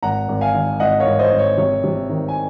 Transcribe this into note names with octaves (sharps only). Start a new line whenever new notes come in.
G#1 F#5 A#5
G#1
F5 G#5
D#3
G#1 D#5 F#5
C#5 F5
G#1
C5 D#5
G#1
C#5
C3 C#5
C3
D#3
G#5